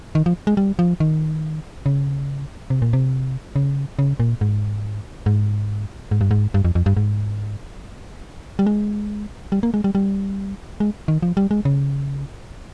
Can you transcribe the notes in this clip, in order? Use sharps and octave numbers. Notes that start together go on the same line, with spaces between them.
D#3
F3
G#3
G3
F3
D#3
C#3
C3
A#2
C3
C#3
C#3
A#2
G#2
G#2
G#2
G2
G#2
G2
F2
F2
G2
G#2
G3
G#3
G3
A#3
G#3
G3
G3
G#3
D#3
F3
G3
G#3
C#3